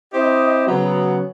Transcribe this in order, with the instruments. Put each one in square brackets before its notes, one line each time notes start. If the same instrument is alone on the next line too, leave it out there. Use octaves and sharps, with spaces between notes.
[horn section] C4 E4 G4 C5 D#5
C#3 F#3 B3